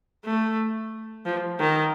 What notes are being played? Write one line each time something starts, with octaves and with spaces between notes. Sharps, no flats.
A3
F3
D#3